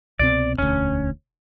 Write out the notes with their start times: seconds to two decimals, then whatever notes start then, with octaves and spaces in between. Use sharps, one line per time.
0.19 C2 B2 C4 D5
0.58 E1 D2 C#4